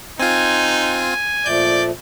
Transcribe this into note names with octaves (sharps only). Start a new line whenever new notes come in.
C4 D#4 F4 G#5
A#2 F3 A3 D5 G6